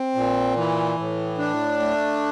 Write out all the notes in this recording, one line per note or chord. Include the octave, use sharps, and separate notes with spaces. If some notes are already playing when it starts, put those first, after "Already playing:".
Already playing: C4
A#2
E3
A2
D4
A3